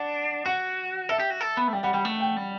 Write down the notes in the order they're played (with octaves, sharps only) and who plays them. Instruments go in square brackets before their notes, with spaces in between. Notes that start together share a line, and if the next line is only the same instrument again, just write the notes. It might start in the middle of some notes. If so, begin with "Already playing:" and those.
Already playing: [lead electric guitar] D4 [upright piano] F#5
[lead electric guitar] F#4 [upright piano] F#5
[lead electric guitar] A4 [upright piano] E5
[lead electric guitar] G4
F#4
A4
B3
A3
[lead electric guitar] G3 [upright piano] G5
[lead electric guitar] G3 [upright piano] F#5
[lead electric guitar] G3 [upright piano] G5
[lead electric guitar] A3
[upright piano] G5
[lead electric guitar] G3